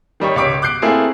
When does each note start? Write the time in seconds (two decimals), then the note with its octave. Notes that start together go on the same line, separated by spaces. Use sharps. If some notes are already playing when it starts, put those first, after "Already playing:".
0.20 D#3 G3 D#4 C#5
0.36 C#2 C#5 D6 B6 D7
0.62 D6 F#6 G6 C7 D7
0.82 A3 A#3 C4 E4 F4 G#4